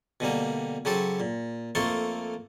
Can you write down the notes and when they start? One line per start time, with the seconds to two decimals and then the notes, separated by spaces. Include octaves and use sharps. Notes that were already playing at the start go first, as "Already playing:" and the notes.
0.20 B2 D3 G3 A#3
0.85 C#3 F#3 G4 A4 C5
1.20 A#2
1.75 F2 A3 A#3 A5 C6 C#6